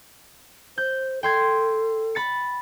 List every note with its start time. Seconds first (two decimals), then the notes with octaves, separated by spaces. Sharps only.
0.78 C5 G6
1.23 A4 G5 C6 G#6
2.15 B5 A6 C#7